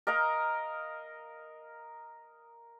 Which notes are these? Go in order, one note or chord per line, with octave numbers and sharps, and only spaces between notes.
A#4 D#5 F5 A#5